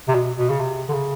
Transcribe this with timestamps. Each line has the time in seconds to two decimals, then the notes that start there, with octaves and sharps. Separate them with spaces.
0.08 C3
0.14 B2
0.37 B2
0.49 C#3
0.60 C3
0.89 D3
0.93 C#3